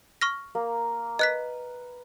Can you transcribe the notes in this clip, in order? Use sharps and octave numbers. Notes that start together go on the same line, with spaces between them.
C#6 F6 A#6
A#3
B4 D#5 F#6 B6